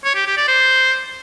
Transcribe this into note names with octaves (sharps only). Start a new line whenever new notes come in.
C#5
G4
G4
D5
C5